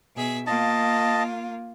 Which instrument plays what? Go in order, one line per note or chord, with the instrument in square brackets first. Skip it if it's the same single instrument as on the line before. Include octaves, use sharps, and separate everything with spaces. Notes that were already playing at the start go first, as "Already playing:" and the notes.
[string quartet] B2 G#4 E5
[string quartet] A#3 F4 [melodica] D#5 A5